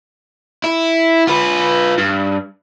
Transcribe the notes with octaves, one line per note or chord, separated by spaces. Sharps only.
E4
F4 B4
G2